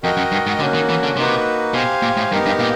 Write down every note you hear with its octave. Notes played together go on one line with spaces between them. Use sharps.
F2 F#4 A#4 D#5 G5
F#2
G2
G#2
D3 A#3 C#4 F#4
D#3
E3
D3
C3 A#3 D#4 F#4 B4
B2 G4 C5 F5 G#5
A#2
A2
G2 B3 D#4 G4 A#4
G2
A#2